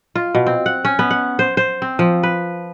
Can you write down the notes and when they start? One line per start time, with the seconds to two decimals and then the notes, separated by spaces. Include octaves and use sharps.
0.15 F4
0.35 B2
0.47 C4
0.66 F#5
0.85 C#4
0.99 B3
1.11 F#5
1.39 C5
1.57 C5
1.82 C4
1.99 F3
2.23 B4